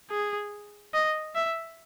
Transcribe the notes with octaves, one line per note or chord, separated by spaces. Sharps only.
G#4
D#5
E5